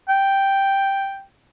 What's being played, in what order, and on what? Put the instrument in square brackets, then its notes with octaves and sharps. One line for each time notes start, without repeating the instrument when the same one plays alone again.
[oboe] G5